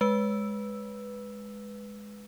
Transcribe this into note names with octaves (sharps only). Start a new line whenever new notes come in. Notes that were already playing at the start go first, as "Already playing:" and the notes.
G#3 B4 E6